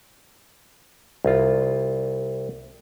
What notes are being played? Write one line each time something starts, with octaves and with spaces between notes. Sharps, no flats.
C2 F4